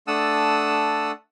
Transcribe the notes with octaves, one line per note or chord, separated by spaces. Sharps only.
A3 D4 F#5 A5 D#6 E6